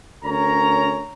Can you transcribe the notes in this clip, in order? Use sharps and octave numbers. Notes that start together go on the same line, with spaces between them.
D2 C#4 A#4 C#5 A#5